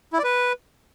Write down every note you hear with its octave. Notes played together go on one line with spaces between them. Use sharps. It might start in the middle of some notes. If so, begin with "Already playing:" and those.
E4
D5
B4